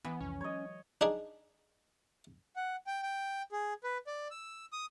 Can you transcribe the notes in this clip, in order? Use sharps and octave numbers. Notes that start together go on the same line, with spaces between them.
E3 B3
C2 F2 C#4
F#3 G#3 C#5 D#5
D4 D#4 G#4
F#5
G5
G5
G#4
B4
D5
E6
D#6